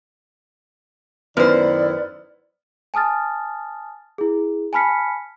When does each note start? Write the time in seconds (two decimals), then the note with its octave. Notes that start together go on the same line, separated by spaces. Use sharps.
1.37 F#2 D#3 B3 E4 C5 D5 F6
2.94 G#5 A5 D#6 F6 A6
4.18 E4 G#4
4.73 G#5 A5 B5 F6 B6 C#7